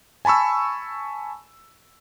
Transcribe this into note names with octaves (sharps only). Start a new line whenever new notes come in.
G#5 A5 B5 C#6 E6